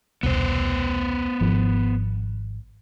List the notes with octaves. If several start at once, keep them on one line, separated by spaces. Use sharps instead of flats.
E1 C2 B3 C5
G#1 F3